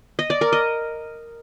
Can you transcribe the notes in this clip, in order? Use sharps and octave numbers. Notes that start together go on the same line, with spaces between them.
D#5
D5
A#4
D#5